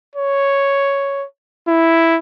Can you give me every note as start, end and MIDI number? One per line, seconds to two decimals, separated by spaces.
0.15 1.25 73
1.68 2.17 64